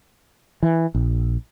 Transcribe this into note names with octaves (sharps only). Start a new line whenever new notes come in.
E3
A#1